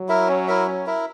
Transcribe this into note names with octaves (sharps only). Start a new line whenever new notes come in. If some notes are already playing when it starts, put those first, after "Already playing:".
Already playing: F#3
E4 A#4 E5
C#4
E4 A#4 E5
C#4
E4 A#4 E5